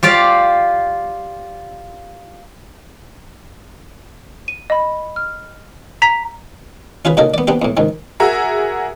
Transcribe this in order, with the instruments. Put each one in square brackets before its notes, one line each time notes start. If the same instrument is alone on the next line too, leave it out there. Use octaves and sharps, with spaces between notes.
[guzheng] F4 G4 D5 F5
[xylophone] D#7
D#5 B5
F6
A#5 B6
[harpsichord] C#4 F4 G#4 B4
A#2 C#3 D#4 F#4 A4 A#4
B3 D5
B3 C4 D4 G4
E2 A2
C#2 G#2 D#3
[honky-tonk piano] F#4 G#4 A#4 E5